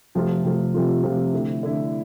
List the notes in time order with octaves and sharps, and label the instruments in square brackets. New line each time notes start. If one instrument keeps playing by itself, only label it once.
[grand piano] C3 F3 A3 C4 F4
C3 F3 A3 C4 F4
C3 F3 A3 C4 F4
C3 F3 A3 C4 F4
D3 A3 E4
D3 A3 E4